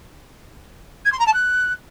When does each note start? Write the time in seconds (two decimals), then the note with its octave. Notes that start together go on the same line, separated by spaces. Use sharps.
1.05 G#6
1.12 C6
1.19 A#5
1.26 A5
1.34 F#6